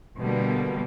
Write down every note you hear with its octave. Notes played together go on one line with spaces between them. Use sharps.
B2 D3 G3 A#3